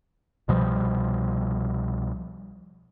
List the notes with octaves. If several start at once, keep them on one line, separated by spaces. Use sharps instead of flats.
C2 B2 F3 G3